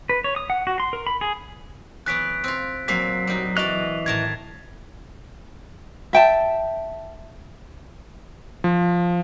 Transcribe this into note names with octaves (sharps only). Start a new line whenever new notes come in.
B4
C#5
D#6
F#5
F#4
C6
A#4
B5
G#4
E3 F#3 B3 F#6 B6 D7
C4 F4
A#2 F#3 A#3 C4 B6 C7
G3 D#4
E3 F#4 D5 D#5 F#6 F7
A2 D#3 A#4 A5 G#6
E5 G5 A5
F3